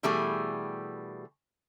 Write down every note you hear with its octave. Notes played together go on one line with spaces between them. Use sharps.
B2 E3 G3 A3 G4 G#4